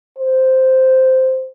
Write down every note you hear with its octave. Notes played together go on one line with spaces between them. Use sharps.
C5